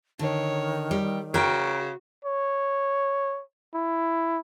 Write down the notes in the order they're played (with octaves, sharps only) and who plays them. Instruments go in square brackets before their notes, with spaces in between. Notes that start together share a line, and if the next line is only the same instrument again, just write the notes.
[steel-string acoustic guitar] D3 [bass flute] D#3 [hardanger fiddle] C#5
[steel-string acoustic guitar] G3
[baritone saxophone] C#3 [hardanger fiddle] F#4 [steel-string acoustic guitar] A#4 G5
[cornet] C#5
E4